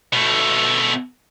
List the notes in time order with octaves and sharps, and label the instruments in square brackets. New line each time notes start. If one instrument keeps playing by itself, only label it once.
[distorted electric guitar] B2 A3